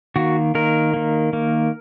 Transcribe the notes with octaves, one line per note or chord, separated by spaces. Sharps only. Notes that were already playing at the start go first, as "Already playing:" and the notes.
D#3 A#3 F#4
D#3 A#3 A#4
D#3 A#3
D#3 A#3